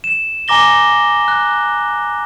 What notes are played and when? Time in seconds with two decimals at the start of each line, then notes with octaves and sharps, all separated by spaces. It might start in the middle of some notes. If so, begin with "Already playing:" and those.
0.04 E7
0.48 G#5 A#5 D6 A#6 G7
1.28 F#6